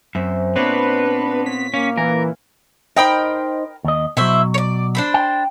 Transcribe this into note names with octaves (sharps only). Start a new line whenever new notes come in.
F#2 C4 E5
A#2 B3 C4 D4 B4 C#5 D5
C#4 B6
A#3 C#4 F5
A#2 E3 A#4 G#5
D#4 A#4 C5 D#5 G5 B5
D#2 D#5
B2 F#3 E4 C5 E5
C#5 D5
D4 C5 B5
G5